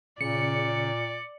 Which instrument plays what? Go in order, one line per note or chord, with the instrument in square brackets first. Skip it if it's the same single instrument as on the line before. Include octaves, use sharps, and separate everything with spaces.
[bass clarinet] A#2 [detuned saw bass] C#3 [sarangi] D5 [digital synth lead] C#7